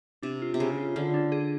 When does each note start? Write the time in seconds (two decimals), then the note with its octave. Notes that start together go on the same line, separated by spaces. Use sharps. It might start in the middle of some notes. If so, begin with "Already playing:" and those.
0.23 C3 D4
0.42 F4
0.54 C3
0.60 C#3 G#4
0.78 F4
0.96 D3 F4
1.14 D4
1.32 G#4